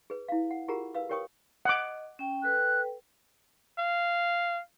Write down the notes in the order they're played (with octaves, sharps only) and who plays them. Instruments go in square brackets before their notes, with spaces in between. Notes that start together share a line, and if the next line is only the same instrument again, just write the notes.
[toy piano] G#4 B4
E4 F5
F#5
F4 G4 G#4 A#4 F#5 A#5
B4 F5 E6
G4 A#4 C#5 G5 C#6 D#6
[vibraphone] D#5 [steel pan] F#5 D6
[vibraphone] C#4 G5
[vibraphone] A4 B4 G5 [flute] F#6
[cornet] F5